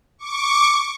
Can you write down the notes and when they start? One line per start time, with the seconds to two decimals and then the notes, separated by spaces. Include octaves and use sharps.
0.18 C#6 D6